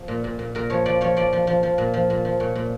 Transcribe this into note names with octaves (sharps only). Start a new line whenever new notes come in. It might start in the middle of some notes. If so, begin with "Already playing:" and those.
Already playing: F3
A#2
A#2
A#2
A#2 A#4
F3 C#5
F3 D5
F3 C#5
F3 D5
F3
F3
F3
A#2
F3
A#2
F3
A#2 C#5
A#2